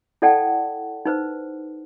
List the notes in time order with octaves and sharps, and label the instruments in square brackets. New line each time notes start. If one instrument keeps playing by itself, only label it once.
[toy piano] E4 A4 D5 F#5 G5 A5
D#4 B4 C5